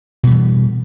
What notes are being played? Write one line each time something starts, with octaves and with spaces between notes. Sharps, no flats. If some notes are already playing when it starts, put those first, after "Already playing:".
B2 E3 G3